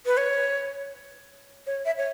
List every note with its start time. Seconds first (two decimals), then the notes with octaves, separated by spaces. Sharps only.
0.06 B4
0.17 C#5
1.67 C#5
1.85 E5
1.98 C#5